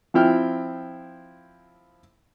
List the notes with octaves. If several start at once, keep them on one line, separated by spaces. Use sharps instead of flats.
F3 C4 E4 G5 F6